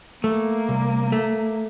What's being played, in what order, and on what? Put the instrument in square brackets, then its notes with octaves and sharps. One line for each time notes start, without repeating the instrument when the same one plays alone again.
[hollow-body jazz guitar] A3 [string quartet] A#3
[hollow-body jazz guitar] C2
A3